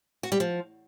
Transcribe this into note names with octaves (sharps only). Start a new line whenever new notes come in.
F#4
G3
F3